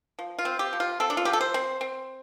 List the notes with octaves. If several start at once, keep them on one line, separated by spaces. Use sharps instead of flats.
F3
F4
C4
G4
F3
F4
C4 A4
D4
F4
F3 G4
A4
C5
C4
C4